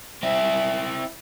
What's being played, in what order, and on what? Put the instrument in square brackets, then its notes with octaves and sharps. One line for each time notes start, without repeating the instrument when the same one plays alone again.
[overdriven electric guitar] C4 E4